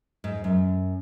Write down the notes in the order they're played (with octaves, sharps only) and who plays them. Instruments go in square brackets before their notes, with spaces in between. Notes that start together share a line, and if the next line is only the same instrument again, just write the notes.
[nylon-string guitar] G#2
F#2